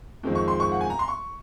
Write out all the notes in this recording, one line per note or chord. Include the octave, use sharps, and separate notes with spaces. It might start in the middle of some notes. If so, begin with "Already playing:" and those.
F2 D#3 G#3 C4
C#6
C6
C#6
F#5
G#5
A#5
C6
C#6